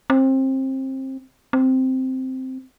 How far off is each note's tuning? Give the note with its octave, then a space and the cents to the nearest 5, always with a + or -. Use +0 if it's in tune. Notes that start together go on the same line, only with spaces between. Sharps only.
C4 +25
C4 -5